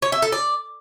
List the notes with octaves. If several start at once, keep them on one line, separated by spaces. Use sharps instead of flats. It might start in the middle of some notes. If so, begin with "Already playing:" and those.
C#5
E5
A4
D5